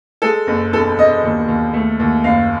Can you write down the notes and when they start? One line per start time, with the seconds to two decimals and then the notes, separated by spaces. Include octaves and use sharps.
0.22 G#3 A4
0.47 F#1
0.72 E1 A4
0.98 E1 D#5
1.24 D#2
1.48 D#2
1.73 A3
2.00 D#2
2.24 F#1 F5